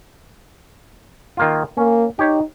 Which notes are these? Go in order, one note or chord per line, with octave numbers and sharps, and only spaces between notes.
D#3 A#3 F4
A#3 C#4
D#4 G4 C#5